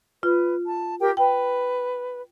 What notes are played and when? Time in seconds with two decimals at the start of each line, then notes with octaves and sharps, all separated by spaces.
0.23 F4 B4
0.66 A5
1.00 G4 A#4 G5
1.17 B4 G5